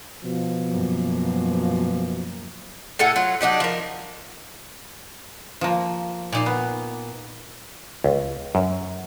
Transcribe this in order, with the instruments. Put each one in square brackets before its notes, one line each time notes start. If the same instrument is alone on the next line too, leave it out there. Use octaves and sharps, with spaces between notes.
[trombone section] B2 F3
[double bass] F#2 A#3
[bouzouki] A2 A4 F#5 G#5
F#3 F4
F#3 D4 D#4 G4
F3 A#4
[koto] F3 A#3
[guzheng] A#2 D#4 C6
[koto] B3
[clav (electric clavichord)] C#2
F#2